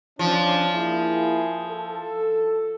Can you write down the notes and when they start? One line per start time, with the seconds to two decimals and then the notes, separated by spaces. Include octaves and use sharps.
0.19 F3 C#4 D4
0.73 A#3 E4 G#4
1.69 A4